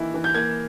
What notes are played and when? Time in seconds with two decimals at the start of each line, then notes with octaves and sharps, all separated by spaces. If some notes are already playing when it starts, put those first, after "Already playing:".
Already playing: D#3 E3 A#3 E4
0.14 E3
0.24 G6
0.35 A#3 G#6